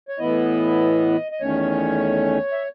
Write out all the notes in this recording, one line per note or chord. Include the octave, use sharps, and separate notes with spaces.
C#5
A2 E3 B3 E4 D#5
D#5
E2 D#3 A3 C#4 C#5
E5